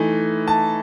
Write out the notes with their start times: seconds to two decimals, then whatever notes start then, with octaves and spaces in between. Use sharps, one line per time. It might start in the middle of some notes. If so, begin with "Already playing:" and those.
Already playing: E3 A3 D#4
0.48 A5